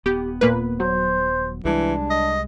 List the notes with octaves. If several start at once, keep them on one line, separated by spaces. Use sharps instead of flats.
D#1 B3 G4
A#2 A#3 B4
F#3 C5
C2 E3 G3 G#3 D4
D#5